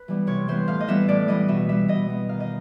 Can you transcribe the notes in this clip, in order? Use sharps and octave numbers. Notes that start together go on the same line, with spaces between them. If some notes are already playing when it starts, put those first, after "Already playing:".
Already playing: B4
E3 G3 B3
C3 C#5
E3 G3 B3 C5
A2 F5
D#5
E3 G3 B3 E5
A2 D5
E3 G3 B3 D#5
B2 E5
G3 B3 E5
B2 D#5
G3 B3
D#3 F5
D#5